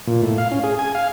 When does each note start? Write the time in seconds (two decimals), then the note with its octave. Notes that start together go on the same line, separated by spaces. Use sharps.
0.07 A#2
0.23 A2
0.38 F5
0.52 C#4
0.64 G#4
0.79 G#5
0.95 F5